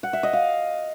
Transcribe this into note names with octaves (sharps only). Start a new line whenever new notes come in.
F#5
E5
D#5
F5